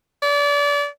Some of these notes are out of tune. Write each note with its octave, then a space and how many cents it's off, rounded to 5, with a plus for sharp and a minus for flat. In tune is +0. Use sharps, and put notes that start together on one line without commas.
D5 -30